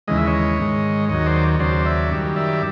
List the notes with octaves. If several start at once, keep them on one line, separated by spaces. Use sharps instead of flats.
D#2 C#3 E3 G#3 D#5
E5
C#5 D#5
G#2 D#3 G#3
D#2 D#3 F#3 C#5 D#5
C5 D5
D#2 C#3 F#3 C5 D5
D5 E5
F#2 D#3 G3
D5 E5